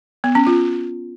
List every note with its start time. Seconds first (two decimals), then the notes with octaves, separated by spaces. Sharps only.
0.24 B3
0.35 C#4
0.47 F4